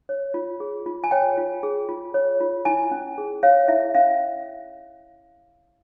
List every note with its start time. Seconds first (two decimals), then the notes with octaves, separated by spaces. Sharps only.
0.09 C#5
0.34 F4
0.60 G#4
0.86 F4
1.04 G#5
1.11 C#5 G5
1.38 F4
1.63 G#4
1.89 F4
2.14 C#5
2.40 F4
2.65 E4 G#5
2.91 C#4
3.18 G#4
3.43 C#5 F5
3.68 E4 E5
3.95 C#4 F5